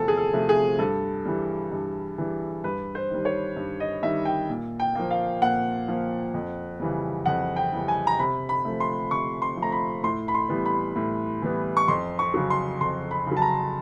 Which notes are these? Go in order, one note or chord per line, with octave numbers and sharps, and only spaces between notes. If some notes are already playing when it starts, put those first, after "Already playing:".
Already playing: E2 C3 F3 A3 A4
G#4
A4
C3 F3 A3
G#4
G2 A4
E3 G3
G2
E3 G3
G2 B4
C5
D#3 G3
C#5
G2
D#5
D#3 G3 E5
G5
A#2
G5
F3 A#3
F5
A#2 F#5
F3 A#3
F2
C#3 E3 G3
F2 F#5
G5
C#3 E3 G3
G#5
A#5
C3 B5
B5
F3 A3
C6
C3 C#6
C6
F3
A3 A#5
B5
A2 C6
B5
C6
E3 G3 B3
B5
A2
E3 G3 B3
C#6
F2 C6
C#6
C#3 F#3
C6
F2 C6
B5
C#3 F#3
A5
A#5